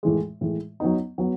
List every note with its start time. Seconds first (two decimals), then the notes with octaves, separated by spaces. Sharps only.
0.03 A2 E3 G#3
0.41 A2 E3 G#3
0.80 F#3 B3 D#4
1.18 F#3 B3